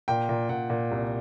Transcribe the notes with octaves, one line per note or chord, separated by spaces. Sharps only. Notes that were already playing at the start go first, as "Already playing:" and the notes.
A#2 G5
A#2
A#2 F#5
A#2
C2